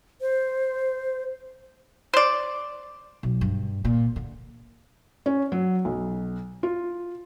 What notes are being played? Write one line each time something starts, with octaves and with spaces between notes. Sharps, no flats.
C5
C5 D5
B1
G2
A#2
D3
C#4
F#3
B1
F4